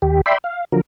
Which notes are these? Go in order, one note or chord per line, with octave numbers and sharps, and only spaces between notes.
D#2 G4
D5 E5 G5 B5 C6
F5
D3 F3 F#3 A#4